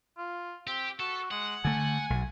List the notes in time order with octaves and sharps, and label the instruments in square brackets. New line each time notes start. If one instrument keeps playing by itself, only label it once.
[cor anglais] F4
[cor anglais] C4 [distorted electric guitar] G4
[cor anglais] F#4 [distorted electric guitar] A4
[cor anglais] G#3 [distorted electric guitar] F#5
[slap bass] D3 A3 [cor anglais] G#5
[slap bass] B1